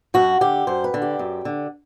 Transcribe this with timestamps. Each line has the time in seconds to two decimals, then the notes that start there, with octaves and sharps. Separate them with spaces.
0.14 F#2 F#4
0.41 D3 G4
0.67 F#2 C5
0.84 B4
0.94 D3
1.02 G4
1.19 F#2
1.45 D3